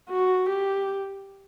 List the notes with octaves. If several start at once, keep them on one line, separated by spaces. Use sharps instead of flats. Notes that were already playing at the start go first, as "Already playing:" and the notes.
F#4
G4